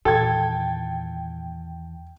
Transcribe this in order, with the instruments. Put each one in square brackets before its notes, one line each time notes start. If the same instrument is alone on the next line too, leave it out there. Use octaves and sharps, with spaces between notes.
[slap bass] E2 D#3 [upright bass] A#2 [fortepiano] A4 [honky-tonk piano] G5 G#6